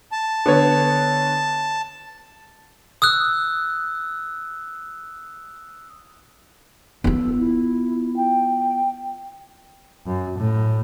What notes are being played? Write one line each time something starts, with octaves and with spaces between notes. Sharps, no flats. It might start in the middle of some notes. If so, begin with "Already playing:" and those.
A5
D3 B3 C#5
D#6 E6 F#6
B3 F4 A4
E4
G5
F#2
A2